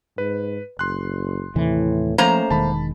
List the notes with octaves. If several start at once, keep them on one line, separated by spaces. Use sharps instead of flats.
G#2 B4
F#1 C6 F#6
D#2 A2 C3 E3
F3 A3 A#3 C#4 C5 A#5
E1 D#3 G#3 A5 B5